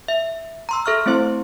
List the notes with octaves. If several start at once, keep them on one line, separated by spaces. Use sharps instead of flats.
E5
A#5 C6 E6
A4 E5 C#6 F6
A3 C4 E4 C5 C6